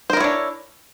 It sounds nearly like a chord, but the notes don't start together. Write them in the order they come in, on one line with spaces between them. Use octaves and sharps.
C5 A#4 E4 C#5 D4